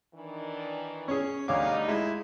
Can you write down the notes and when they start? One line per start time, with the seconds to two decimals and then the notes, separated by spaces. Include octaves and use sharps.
0.15 D#3 E3 D4
1.08 C#4 G#4 C#5
1.48 D2 G3 D#4 C#5 F5 D6
1.88 G#3 E4